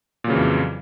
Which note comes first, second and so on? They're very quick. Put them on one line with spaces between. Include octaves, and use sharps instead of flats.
A#2 F#3 C#3 E3 F2